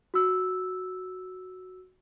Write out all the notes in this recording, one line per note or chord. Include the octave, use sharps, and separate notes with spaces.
F#4 E6